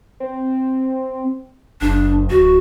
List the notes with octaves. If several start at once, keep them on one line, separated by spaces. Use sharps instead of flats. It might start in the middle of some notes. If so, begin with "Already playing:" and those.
C4
F#1 D4
D1 F#4